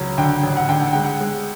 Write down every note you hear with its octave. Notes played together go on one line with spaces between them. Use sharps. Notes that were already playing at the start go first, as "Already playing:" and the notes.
Already playing: C#2 F#3
D3 G5
A1
F#5
D3 G5
F#5
G#3 G5
F#5
G#3